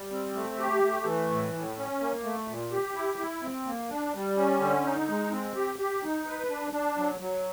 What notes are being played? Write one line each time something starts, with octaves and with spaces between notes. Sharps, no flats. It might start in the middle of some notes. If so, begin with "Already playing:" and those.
Already playing: G3
C4
A3
G4
A3
E3
A2
A2
C#4
A#3
A3
A#2
G4
E4
E4
C4
A#3
D4
G3
C#4
D3
D#4
G#3
C4
G4
G4
D#4
B4
D4
D4
F#3
F#3